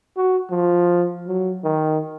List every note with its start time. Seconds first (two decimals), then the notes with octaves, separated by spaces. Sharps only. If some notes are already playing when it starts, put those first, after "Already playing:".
0.17 F#4
0.50 F3
1.27 F#3
1.64 D#3